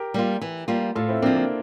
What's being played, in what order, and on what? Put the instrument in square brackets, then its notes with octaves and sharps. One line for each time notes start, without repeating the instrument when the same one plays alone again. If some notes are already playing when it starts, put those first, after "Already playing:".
Already playing: [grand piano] G4 A#4
[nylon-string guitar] G3 A#3 F4
E3
G3 A#3 F4
[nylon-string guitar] A2 [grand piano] F4 A4
[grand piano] C4 E4
[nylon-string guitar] F3 C4 [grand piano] A#3 D4
[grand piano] A#3